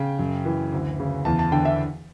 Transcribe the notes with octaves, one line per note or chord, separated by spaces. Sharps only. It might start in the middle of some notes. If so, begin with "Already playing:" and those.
Already playing: C#3 G5
F#2
E3
D2
C#3
E2 A5
A5
D3 G5
E5